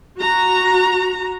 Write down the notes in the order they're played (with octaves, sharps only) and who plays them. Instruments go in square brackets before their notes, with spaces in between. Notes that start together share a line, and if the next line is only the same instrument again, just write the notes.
[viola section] F#4 A#5